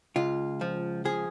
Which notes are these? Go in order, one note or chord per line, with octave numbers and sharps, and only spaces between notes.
C#2 F4
F3
F3 G#4